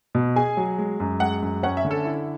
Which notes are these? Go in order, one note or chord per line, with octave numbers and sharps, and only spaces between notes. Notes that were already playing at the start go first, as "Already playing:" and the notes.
B2
G#4 G#5
F#3
G#3
F#2
G#3 F#5
F#2
C#4 F#5
E5
D3
A4
E4